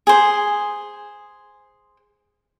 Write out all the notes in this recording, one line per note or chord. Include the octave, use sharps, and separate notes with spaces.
G#4 C5